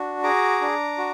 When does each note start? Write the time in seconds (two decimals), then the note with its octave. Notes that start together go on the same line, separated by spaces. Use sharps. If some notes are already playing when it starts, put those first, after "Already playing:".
Already playing: D4 F#4
0.23 G#4 A#5 D6
0.61 D4
0.98 F#4